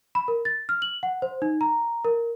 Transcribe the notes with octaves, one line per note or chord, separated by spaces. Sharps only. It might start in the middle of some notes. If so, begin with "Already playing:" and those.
B5
A#4
A6
F6
F#7
F#5
C5
D#4
A#5
A#4